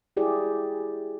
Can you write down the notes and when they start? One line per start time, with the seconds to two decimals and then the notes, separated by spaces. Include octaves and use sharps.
0.17 E4 G4 G#4 D5